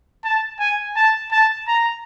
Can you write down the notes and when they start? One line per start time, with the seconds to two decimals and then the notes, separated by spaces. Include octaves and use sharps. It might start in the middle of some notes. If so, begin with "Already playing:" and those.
0.24 A5
0.60 G#5
0.96 A5
1.32 A5
1.68 A#5